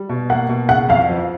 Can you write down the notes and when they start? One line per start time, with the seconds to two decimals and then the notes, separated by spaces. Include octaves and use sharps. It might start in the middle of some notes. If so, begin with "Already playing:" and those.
Already playing: G3
0.09 B2
0.29 A#3 F#5
0.49 B2
0.69 C#3 F#5
0.89 F2 F5
1.09 F3